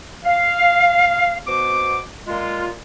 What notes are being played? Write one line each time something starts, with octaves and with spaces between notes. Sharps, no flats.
F5
B2 B3 C5 D6
A#2 G#3 F4